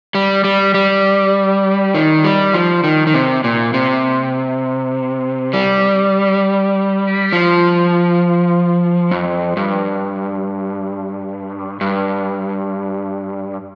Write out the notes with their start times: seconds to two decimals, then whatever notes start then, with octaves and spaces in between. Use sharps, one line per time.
0.15 G3
0.44 G3
0.74 G3
1.95 D#3
2.24 G3
2.54 F3
2.84 D#3
3.07 D#3
3.14 C3
3.44 A#2
3.74 C3
5.53 G3
7.33 F3
9.11 F2
9.57 G2
11.81 G2